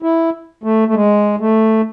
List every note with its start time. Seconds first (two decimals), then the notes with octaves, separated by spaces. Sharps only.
0.02 E4
0.64 A3
0.88 A3
0.94 G#3
1.40 A3